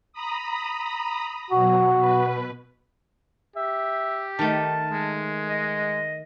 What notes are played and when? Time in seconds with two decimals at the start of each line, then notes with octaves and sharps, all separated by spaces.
0.13 A#5 B5 D#6
1.51 B2 F#3 F#4
1.97 B2 B4
3.56 G4 E5
4.39 D#3 A3 A5
4.91 G#3
5.49 D#5